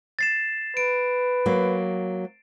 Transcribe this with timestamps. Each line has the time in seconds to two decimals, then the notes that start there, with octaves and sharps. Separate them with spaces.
0.19 A6 C7 E7
0.77 B4 D7
1.46 F#3 A#3